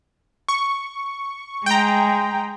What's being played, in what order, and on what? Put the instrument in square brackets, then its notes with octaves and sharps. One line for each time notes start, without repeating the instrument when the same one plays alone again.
[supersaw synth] C#6
[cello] G#3 [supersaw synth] G5 A#5